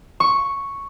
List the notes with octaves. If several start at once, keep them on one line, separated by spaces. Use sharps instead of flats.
C#6